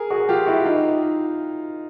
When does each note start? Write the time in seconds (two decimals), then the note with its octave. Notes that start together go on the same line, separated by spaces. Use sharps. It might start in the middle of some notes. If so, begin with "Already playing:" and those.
Already playing: G#4 A#4
0.10 F#4 G#4
0.29 F4 G4
0.46 E4 F#4
0.65 D#4 F4